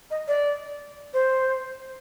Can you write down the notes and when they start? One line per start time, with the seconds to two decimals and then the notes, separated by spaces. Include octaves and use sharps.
0.11 D#5
0.28 D5
1.14 C5